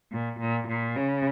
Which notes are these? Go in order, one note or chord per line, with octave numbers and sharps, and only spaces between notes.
A#2
A#2
A#2
C#3